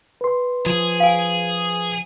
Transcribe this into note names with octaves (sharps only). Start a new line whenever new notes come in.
B4 C6
F3 G#4
F5 G#5